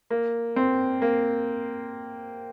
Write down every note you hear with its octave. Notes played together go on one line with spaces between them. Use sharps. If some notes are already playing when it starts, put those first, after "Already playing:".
A#3
C4
A#3